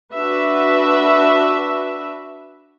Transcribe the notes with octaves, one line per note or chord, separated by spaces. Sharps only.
D4 F#4 B4 E5